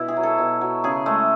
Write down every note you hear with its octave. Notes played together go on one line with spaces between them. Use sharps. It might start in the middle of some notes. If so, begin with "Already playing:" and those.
Already playing: B2 E4
G#4
F#3
A4
B2
F#3
C#3 G#4
G#3 A3